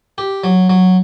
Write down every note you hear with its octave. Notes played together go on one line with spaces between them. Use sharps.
G4
F#3
F#3